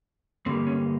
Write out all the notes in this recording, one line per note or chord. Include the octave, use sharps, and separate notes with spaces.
G2 D3 G3 A#3 C4
C#4